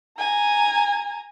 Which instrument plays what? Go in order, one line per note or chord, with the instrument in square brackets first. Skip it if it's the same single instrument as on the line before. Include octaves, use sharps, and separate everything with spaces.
[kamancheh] G#5 A#5